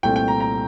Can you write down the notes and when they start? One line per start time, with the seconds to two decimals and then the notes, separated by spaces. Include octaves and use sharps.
0.03 C2 A#2 A3 C4 G5
0.16 G5
0.28 A#5
0.40 A#5